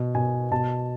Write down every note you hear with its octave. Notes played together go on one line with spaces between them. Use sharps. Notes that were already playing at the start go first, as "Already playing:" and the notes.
Already playing: B2
B2 G#5
B2 A5